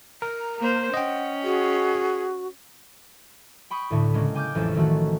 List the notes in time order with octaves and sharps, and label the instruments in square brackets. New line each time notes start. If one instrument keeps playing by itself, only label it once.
[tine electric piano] A#4 [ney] A#5
[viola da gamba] A#3 C5
[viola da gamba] C#4 [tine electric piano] D#5 G5 [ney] F#5
[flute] F#4 [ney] G#4
[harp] G5 B5 C#6 D#6
D2 A2 D3
C#3 G#3 A#3 C#4
G5 G#5 D6 F6 G6
A1 F2 G#3 C#4 A4
D#3 F3 A3 F#4